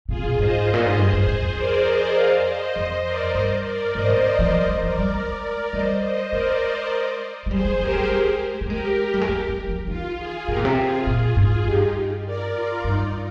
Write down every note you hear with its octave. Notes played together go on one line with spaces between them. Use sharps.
C3 F4 G#4
A#2
G#2 C5 D#5
A#2
G#2
G2 G#4 C5
G2
G#2
F2
A#4 D5
C5 D#5
D5 F5
C5 D#5
F2 C5 D#5
A#4 D5
G2 C5 D#5
A#4 D5
G#2 C5 D#5
D#3
F3
G3 C5 D#5
G#3
F3 A#4 D5
G3
G#3
G3 C5 D#5
C5 D#5
G#3 A#4 D5
G#3
G3 G#4 C5
G#3
G#3 G4 A#4
G3
G#3
A#3
G#3 G4 A#4
G3
G#3
A#3
G#3
F3
D#3 F4
F4 G#4
C3 G4 A#4
A#2
C3
F4 G#4
A#2 F4
G#2 F4
G2 D#4 G4
A#4 D5
F4
G2 D#4